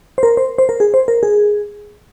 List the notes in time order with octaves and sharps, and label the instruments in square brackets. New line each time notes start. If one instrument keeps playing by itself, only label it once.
[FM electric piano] C5
A#4
C5
C5
A#4
G#4
C5
A#4
G#4